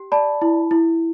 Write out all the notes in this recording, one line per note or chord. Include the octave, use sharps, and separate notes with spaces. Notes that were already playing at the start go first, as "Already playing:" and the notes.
Already playing: G4
D5 A5 B5
E4
E4